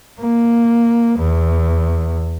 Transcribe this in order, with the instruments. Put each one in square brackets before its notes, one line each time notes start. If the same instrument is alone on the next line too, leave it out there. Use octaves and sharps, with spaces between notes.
[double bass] A#3
E2